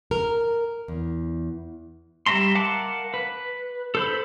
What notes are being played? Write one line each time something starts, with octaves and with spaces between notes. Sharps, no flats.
A#4
E2
G3 A#3 E5 A#5 C6
A#4 F5 F#5 A5 D6
B4
A4 C5 B5